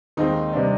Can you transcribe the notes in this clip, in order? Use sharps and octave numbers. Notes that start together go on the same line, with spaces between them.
D#2 D#3 G#3 C4 D#4 D#5
C3 G3 D4